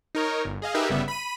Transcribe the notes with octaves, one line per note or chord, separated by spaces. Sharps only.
D#4 A#4 C#5
G1
G#4 D#5 F5
D#4 G4 G#4 A#4 B4 E5
G1 C#3 G3 B3 E5
B5 D#7